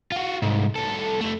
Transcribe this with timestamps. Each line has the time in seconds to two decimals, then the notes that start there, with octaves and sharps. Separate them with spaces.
0.12 F4 F#4
0.42 C2 G#2
0.75 C2 A4
1.21 F2 A3